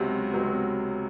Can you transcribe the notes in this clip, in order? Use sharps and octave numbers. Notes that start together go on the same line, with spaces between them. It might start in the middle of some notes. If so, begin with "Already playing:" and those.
Already playing: C#2 C3 F#3
C#2 C3 F#3